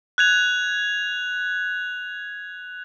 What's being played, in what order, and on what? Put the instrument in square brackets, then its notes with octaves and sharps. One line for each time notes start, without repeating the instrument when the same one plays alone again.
[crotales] F#6 G#6 F7